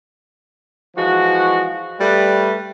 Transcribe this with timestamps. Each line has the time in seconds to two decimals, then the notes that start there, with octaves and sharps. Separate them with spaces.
0.97 E3 F3 G#3 F#4
2.00 G3 A3 B4